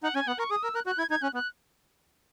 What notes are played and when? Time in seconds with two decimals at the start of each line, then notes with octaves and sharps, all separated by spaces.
0.03 D#4 F#5
0.15 C#4 G#5
0.27 B3 F#5
0.39 A#4 C#6
0.51 G#4 D#6
0.63 A#4 E6
0.75 A#4 F#6
0.86 F#4 F#6
0.98 E4 G#6
1.10 D#4 G#6
1.22 C#4 F#6
1.34 B3 F#6